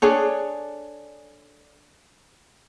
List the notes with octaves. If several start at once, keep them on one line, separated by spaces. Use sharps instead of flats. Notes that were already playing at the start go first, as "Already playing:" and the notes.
D4 G#4 A4 C#5